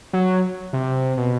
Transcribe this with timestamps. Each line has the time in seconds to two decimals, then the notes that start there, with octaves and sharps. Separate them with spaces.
0.13 F#3
0.73 C3
1.17 B2